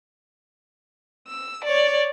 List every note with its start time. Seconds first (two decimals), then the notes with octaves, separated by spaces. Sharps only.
1.28 E6
1.64 C#5 D5